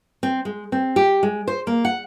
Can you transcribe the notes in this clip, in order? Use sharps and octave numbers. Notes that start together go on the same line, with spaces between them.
C4
G#3
C4
G4
G#3
C5
A#3
F#5